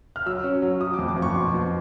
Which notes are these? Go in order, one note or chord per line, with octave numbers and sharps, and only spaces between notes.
F6
F#3 E6
C#4
F#3
F#3 D#6
D6
F2
D6
F2
C#6
B2 C6
B2